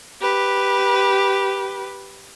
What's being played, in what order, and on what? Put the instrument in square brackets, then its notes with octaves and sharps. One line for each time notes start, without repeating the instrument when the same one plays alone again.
[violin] G4 B4